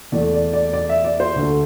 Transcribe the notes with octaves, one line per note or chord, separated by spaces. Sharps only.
E2 E3 A3 D5
D5
D5
D5
E5
D5
C5
D2 D3 A3